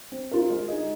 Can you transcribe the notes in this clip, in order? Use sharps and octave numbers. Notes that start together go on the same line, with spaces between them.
C4
F4 A#4
G#3
D#4 G#4 D#5